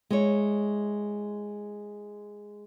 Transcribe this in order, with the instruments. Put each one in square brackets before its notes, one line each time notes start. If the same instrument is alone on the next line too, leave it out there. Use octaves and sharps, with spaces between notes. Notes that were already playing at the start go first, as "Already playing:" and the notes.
[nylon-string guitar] G#3 E4 C#5